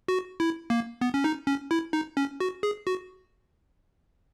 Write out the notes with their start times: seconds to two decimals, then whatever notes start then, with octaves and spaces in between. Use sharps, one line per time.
0.08 F#4
0.40 E4
0.70 A#3
1.01 B3
1.14 C#4
1.24 D#4
1.47 C#4
1.71 E4
1.93 D#4
2.17 C#4
2.40 F#4
2.63 G#4
2.87 F#4